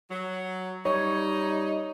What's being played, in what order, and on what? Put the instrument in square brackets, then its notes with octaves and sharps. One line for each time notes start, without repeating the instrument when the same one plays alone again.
[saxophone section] F#3
[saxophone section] G3 D#4 [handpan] C#5